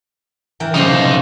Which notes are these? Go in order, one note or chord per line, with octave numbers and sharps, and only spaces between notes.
E3 A#4 G5
C2 C#3 A#3 D#4 C5